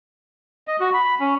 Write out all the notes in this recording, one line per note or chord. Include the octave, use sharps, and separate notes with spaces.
D#5
F#4
B5
C#4